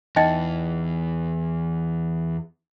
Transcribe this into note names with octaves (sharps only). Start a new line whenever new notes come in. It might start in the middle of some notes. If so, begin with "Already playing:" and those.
E2 D#4 D#5 G5